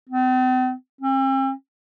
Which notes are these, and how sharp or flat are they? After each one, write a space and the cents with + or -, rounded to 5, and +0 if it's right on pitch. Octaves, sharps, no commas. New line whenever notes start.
C4 -45
C4 +45